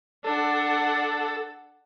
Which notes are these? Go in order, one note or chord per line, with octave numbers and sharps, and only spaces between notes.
D4 A4 F#5